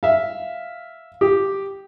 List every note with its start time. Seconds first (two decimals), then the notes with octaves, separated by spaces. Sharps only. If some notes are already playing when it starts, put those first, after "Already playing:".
0.03 E5 F5
1.21 G4